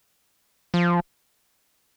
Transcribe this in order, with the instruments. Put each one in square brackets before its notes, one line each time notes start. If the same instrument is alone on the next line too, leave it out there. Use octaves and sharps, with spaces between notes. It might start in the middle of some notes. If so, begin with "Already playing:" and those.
[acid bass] F3